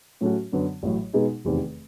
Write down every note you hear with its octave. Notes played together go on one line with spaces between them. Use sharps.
A2 F#3 A3 C#4 F#4
F#2 D3 F#3 B3
A1 A2 F#3
B2 G#3 B3 D#4 G#4
F1 E2 C3 D#3